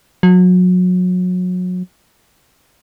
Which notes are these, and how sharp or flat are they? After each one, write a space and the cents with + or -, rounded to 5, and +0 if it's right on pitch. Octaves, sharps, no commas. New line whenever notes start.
F#3 -30